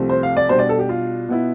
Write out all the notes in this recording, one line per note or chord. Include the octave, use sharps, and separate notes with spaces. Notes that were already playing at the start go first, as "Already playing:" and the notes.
Already playing: C2 C3 F3 A3 C4
C5
F5
D5
B2 G3 D4 C5
D5
A4
G4
F4
B2 B3 E4